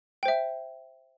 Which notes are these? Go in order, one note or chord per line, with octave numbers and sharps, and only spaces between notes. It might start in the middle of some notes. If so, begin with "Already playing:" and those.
C5 E5 G5